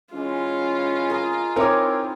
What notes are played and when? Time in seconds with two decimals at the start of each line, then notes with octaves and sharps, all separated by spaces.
0.15 E3 G#3 C#4 F4
1.10 G#4 A#4 D#5
1.56 C4 D#4 E4 A#4 C#5 D6